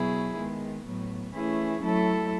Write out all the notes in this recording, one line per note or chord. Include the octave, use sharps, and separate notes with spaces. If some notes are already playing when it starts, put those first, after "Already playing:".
Already playing: B2 F#3 B3 E4 G#4
D#3 G#3 B3
A2 F#3 B3
E3 A3 C#4 E4 G#4
F#3 A3 E4 A4